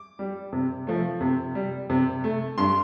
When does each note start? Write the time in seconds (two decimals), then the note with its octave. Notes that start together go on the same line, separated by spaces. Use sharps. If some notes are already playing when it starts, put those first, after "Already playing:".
Already playing: D6
0.19 G3
0.53 C3
0.87 F3 A3
1.21 C3
1.55 G3
1.90 C3
2.24 A3
2.58 G2 C6